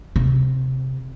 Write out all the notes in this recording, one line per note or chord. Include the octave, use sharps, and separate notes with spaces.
C3